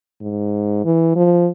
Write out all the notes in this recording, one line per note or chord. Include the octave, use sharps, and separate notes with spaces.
G#2
E3
F3